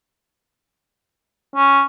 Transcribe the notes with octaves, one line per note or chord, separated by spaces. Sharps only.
C#4